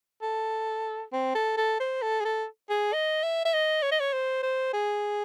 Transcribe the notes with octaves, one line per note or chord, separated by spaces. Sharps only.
A4
C4
A4
A4
C5
A4
G#4
A4
G#4
D#5
E5
E5
D#5
C#5
D#5
C#5
C5
C5
G#4